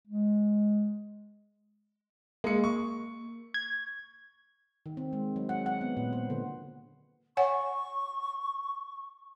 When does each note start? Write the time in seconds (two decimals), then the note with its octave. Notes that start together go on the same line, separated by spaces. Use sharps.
0.07 G#3
2.44 G#3 A#3 C#7
2.64 C#6
3.54 G#6
4.86 D#3
4.97 C4
5.13 G#3
5.36 F#3
5.49 F#5
5.66 F#5
5.81 B3
5.97 A#2
6.13 C5
6.30 D3
7.37 C#5 F#5 G#5 C#6